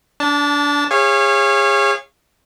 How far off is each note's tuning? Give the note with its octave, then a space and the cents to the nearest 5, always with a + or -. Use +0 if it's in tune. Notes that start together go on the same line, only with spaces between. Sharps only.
D4 -25 A5 +0
G#4 -30 C#5 -20 F5 -25